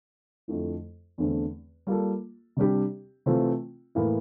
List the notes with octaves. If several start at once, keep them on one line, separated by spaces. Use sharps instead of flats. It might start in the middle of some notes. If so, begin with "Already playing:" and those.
F2 D3 F3 A3 E4
E2 D3 A3 C4
G3 A#3 F4 A4
C3 G3 D4 G4
C3 E3 A3 C4 F4
A2 E3 A#3 E4